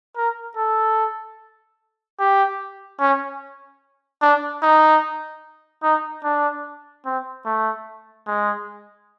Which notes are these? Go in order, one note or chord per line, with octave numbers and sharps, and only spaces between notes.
A#4
A4
G4
C#4
D4
D#4
D#4
D4
C4
A3
G#3